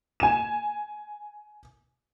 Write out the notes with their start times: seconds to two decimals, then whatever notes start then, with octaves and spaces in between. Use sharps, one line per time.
0.20 G#5 E7